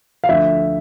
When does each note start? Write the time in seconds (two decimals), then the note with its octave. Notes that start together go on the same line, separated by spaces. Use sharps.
0.24 F5
0.29 D2 D3 F3 E5